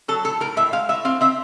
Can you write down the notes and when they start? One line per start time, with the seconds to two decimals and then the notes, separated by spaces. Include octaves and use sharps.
0.08 F#3 A4
0.24 A2 A4
0.40 A2 A#4
0.57 A2 E5
0.73 G#3 F5
0.89 A2 E5
1.05 C4 F5
1.21 C4 E5